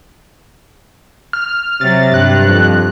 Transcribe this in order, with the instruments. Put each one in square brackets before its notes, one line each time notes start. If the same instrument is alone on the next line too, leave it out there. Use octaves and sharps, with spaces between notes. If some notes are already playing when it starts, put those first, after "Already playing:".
[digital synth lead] F6
[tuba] C3 [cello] F#3 [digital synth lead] A6
[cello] G2 [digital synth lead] F#6
[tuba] F2